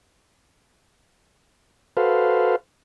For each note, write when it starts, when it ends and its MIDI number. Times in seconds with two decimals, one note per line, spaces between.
1.97 2.56 66
1.97 2.56 69
1.97 2.56 71
1.97 2.56 72
1.97 2.56 77